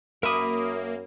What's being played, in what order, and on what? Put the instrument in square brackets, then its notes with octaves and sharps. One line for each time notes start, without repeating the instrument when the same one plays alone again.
[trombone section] F#2 [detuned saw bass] A#3 [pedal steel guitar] A#4 D6 [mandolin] E5 B5 D#6